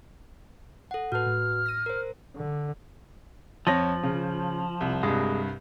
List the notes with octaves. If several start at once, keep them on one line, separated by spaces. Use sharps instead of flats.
A4 F#5
A2 F#4 B4 A5 F6
A2
A#6 D#7
A#4 C5
D3
F2 F3 C#5 A#6
C#3
C2
C2 G2 G#3